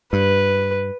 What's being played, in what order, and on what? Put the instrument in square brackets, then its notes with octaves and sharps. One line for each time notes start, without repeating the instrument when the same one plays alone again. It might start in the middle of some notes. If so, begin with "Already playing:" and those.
[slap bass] G2 [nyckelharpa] B4